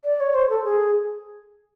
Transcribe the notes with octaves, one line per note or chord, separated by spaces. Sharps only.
D5
C#5
C5
A4
G#4